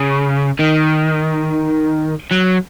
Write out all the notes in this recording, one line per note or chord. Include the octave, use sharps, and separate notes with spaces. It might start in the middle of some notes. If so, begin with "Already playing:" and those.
Already playing: C#3
D#3
F#3